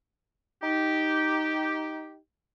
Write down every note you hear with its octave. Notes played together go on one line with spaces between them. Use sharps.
D#4 G4